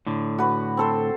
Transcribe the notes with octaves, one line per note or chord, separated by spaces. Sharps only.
A2 D3
F#4 B4
C4 A4 C5